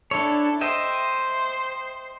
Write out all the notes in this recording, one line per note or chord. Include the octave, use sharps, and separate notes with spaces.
D4 E4 A4 C#5
C5 D#5 E5 G5